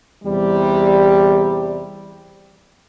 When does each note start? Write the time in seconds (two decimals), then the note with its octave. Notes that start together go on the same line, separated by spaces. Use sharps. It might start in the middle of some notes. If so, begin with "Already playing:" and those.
0.24 E2 C3 G3